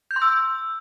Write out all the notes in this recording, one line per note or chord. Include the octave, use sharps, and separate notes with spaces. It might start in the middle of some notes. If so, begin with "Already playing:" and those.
G6
C6
E6